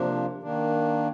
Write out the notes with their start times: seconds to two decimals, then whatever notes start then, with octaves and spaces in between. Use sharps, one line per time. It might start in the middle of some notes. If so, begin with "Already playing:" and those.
Already playing: C3 F3 A#3 D4
0.42 D#3 A#3 D4